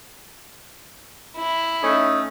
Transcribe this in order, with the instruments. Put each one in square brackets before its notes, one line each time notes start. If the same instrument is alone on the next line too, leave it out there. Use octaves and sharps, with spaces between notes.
[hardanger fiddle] E4
[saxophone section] A3 C#4 D#4